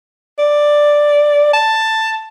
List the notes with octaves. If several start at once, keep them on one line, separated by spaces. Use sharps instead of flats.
D5
A5